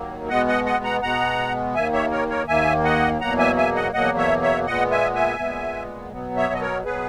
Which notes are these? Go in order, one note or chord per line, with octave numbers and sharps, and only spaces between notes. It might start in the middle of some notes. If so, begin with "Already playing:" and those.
Already playing: D#2 D#3 F#3 A#3
B2 G#3 B3 D#5 F#5
D#5 F#5
D#5 F#5
F#5 A#5
B2 G#3 B3 F#5 A#5
D#2 D#3 A#3 E5 G#5
C#5 E5
A#4 C#5
A#4 C#5
D#2 D#3 A#3 E5 G#5
D#5 F#5
E2 B2 F#3 A#3 F#5 A#5
E5 G#5
E5 G#5
D#5 F#5
E2 B2 F#3 A#3 D#5 F#5
C#5 E5
C#5 E5
A#2 G#3 B3 D#5 F#5
E5 G#5
E5 G#5
A#2 G#3 B3
B2 F#3 B3
C#5 E5
D#5
A#4 C#5
B2 F#3 B3 G#4 B4